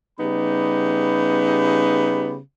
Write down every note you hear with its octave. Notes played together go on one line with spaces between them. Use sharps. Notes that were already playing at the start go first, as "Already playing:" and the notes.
C#3 G3 B3 D#4 G4 B5